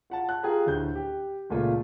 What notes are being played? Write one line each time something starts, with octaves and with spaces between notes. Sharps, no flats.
F4 F#5 A5
F#6
F4 G4 G#4 G5 G#5 A#5
D2 A2 G6
G4
C#2 A#2 A3 F4